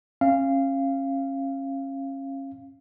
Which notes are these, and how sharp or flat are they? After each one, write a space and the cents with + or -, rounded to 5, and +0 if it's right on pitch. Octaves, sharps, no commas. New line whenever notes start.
C#4 -30 F5 -15